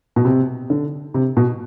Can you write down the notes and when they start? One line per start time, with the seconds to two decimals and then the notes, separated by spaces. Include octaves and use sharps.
0.16 B2
0.25 C3
0.70 D3
1.14 C3
1.37 B2